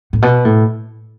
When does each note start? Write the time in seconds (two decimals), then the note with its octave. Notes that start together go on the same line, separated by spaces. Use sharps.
0.13 A2
0.22 B2
0.45 A2